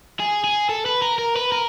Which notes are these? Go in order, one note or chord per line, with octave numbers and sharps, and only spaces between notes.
G#4
G#4
A4
B4
A#4
A#4
B4
A#4